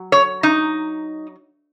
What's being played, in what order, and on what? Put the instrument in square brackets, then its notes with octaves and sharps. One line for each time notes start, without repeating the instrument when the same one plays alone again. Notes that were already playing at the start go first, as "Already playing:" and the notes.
Already playing: [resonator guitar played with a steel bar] F#3
C#5
D#4